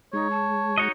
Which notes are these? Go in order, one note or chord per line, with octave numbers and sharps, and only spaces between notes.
G#3 D#4 C#5
A5
D#4 F#4 C#5 D#5